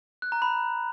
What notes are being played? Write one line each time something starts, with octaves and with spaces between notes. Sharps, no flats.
F#6
A#5
B5